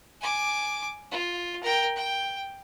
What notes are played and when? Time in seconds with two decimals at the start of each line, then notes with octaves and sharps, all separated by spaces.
0.21 G#5 D6
1.11 F4
1.63 A#4 G5
1.96 G5